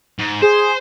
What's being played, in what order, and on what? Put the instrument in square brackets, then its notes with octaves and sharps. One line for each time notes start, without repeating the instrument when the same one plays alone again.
[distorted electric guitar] G#2
[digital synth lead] G#4 [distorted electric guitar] C5